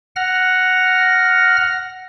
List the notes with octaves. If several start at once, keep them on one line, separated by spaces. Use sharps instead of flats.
F#5 F6 A#6